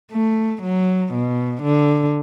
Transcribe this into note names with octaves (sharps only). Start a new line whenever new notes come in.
A3
F#3
B2
D3